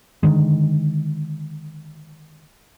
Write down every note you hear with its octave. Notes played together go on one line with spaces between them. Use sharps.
D3 D#3 G#3